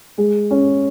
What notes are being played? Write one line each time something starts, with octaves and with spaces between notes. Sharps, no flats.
G#3
C#4